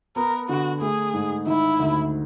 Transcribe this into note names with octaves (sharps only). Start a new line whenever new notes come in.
B3 A#4
D3 F#4
A3 G#4
G#2
D#3 E4
D2